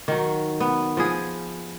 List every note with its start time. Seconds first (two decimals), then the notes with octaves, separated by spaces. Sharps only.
0.08 D#3 F#3
0.60 B3
0.97 F3 B3 G#4